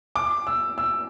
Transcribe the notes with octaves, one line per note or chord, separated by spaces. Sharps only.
D6
E6
E6